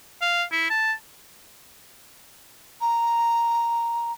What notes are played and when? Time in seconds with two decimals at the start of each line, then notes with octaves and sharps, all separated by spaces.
0.21 F5
0.52 E4
0.70 A5
2.81 A#5